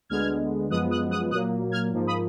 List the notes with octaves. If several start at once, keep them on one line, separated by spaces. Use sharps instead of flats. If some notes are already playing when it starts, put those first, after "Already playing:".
D2 D3 G#3 B3 F6 G#6
F#2 F3 G#3 B3 D#6 F#6
D#6 F#6
D#6 F#6
A#2 F#3 A#3 D#6 F#6
F6 G#6
G#2 F3 A#3
B5 D#6